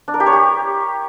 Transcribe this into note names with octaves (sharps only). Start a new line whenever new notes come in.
D4
A#4
G4
C#5
G4